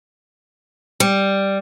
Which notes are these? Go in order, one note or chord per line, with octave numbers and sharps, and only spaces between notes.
G3